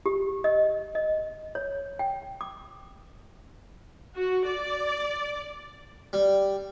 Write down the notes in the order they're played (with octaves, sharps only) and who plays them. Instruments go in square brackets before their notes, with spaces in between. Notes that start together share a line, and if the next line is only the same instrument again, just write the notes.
[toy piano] G4
D#5
D#5
C#5
G5
D6
[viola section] F#4
D5
[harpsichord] G3